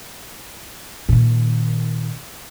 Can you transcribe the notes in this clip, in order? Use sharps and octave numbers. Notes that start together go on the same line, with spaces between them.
A#2 D#3